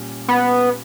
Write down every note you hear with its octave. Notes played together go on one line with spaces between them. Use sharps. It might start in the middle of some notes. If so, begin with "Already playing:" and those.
Already playing: A#2 G3 C#4 G4
B3